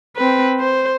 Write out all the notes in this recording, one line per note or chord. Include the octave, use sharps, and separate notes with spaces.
C4 B4
C5